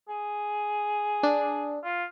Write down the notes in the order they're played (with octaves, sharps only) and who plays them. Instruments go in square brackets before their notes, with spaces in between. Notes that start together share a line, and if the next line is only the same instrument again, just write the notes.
[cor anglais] G#4
[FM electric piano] D4
[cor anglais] F4